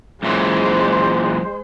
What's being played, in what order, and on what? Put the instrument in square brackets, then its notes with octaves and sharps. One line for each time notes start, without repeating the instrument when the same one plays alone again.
[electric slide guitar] F#2 A#2 E3 [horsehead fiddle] G#3 C5